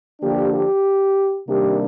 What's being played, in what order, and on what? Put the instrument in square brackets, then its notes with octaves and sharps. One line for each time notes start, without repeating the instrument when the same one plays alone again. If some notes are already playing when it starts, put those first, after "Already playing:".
[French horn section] D3 F3 A#3 D4 G4
G4
C3 D#3 G3 A#3 D4 G4